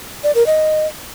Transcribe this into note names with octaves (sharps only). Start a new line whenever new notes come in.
D5
A#4
D#5